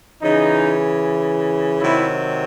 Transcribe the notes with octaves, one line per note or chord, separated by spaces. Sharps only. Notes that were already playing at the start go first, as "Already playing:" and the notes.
C#3 E3 D#4
C3 D#3 F#3 E4